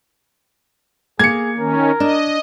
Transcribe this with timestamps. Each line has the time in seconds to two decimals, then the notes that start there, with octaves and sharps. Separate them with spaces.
1.19 A#3 G#4 G#6 C#7
1.58 D#3 C#4 A#4
2.00 D4 D#5